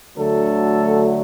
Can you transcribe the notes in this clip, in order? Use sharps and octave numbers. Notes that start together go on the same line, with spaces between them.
D2 D3 F#3 A3 A4